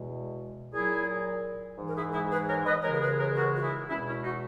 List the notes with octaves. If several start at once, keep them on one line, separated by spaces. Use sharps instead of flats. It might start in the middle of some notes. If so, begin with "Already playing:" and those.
Already playing: E2 B2 G#3
A#2 F#3 E4 G#4
G#2 E3 G#3
A#4
E4 G#4
E4 G#4
G#4 B4
A#4 C#5
B4 D#5
D#2 C#3 E3 G#3 A#4 C#5
A#4
G#4 B4
A#4 C#5
F#4 A#4
F#4
E4 G#4
E2 B2 G#3 C#4 E4
C#4 E4
D#4 F#4